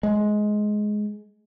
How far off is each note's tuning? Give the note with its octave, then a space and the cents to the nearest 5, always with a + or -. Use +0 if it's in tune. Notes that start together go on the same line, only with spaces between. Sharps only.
G#3 +15